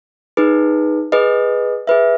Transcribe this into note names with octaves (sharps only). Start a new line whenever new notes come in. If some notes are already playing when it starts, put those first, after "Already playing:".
D#4 G#4 B4
G#4 B4 D#5
G#4 B4 E5